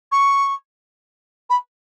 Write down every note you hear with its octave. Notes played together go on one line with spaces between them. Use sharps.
C#6
B5